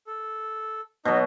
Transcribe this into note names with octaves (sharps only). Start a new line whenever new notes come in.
A4
B2 F#3 D#4